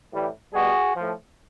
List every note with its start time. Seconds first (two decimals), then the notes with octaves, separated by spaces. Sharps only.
0.11 A2 E3 G3
0.53 B2 G3 F#4 G#4
0.95 A2 F3